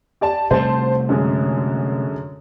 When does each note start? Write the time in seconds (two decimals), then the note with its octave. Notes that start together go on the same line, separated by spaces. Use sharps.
0.21 G4 D5 A5
0.51 C3 G3 A3 C5 A5
1.09 F#2 D3 G#3